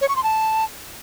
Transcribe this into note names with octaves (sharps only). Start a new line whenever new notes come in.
C#5
C#6
C6
A5